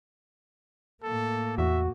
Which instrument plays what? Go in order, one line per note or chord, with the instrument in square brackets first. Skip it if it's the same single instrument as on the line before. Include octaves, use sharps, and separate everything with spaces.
[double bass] A2 A#3 [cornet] A4
[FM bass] E2 [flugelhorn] F#4 [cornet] E5